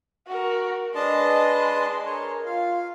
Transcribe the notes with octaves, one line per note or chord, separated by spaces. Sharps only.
F#4 A#4
G#3 D4 B4 D#5 A5 C6
A#4 C#5
F4 F5